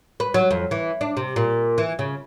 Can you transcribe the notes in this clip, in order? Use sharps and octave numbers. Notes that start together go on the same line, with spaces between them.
B4
F#3
F2
E3
D4
C3
A#2
E3
C#3